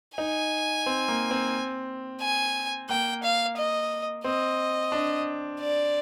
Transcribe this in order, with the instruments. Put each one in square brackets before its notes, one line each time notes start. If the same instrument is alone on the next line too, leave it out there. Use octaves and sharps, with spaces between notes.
[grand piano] D#4 [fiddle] G#5
[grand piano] C4
A#3
C4
[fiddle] G#5
[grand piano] A#3 [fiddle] G5
[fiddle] F5
D#5
[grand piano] C4 [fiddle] D#5
[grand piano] D4
[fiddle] D5